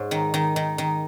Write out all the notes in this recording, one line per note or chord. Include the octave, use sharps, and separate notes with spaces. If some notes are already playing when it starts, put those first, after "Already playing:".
Already playing: G#2 C#5
D#3
D#3
D#3
D#3